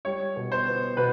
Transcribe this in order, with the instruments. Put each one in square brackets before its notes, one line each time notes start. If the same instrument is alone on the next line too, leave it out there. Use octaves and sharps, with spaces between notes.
[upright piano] G3 C#5
B2
C5
B3
B2 B4